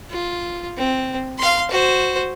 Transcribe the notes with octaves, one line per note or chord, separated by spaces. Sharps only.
F4
C4
F5 C6
F#4 C5